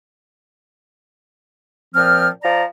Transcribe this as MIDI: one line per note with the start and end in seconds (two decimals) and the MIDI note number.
1.95 2.28 46
1.95 2.28 53
1.95 2.28 60
1.95 2.28 89
2.43 2.62 53
2.43 2.62 74
2.43 2.62 82